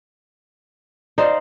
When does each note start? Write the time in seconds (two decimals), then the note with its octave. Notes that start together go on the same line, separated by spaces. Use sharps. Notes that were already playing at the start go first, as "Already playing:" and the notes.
1.18 D#4 C5 D5 F5